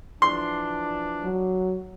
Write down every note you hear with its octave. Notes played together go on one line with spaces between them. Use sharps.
E3 F3 D4 C6
F#3